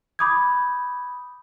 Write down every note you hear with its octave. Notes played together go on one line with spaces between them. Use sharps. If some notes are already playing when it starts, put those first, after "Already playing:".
B5 D6 D#6 G6 G#6